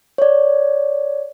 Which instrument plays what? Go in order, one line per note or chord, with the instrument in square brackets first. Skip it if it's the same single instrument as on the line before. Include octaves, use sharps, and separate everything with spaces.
[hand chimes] C#5 D5